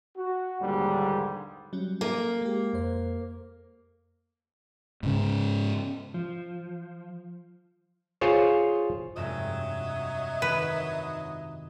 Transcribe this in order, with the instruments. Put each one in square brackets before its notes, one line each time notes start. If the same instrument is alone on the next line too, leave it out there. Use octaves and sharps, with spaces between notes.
[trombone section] F#4
A#1 D#2 G#2 D3 G3
[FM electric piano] F#3 G3 C#4
[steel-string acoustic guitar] A#3
[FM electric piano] G#3 G4
F2 C5
[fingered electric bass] G#2 C#3
[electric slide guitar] F3
[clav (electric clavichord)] F4 G#4 C5 C#5
[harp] F1 G2 G#3 [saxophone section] F#3 D#5 E5
[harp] D#3 [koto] B4